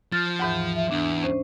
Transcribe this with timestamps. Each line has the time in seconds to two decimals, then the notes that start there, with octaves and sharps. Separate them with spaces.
0.12 F3 F6 A6
0.39 D#2 G#2 E3
0.76 E5
0.91 E2 D4
1.23 C#4 C5